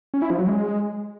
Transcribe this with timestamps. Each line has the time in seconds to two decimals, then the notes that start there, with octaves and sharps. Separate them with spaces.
0.14 C#4
0.22 E4
0.30 F3
0.39 F#3
0.47 G#3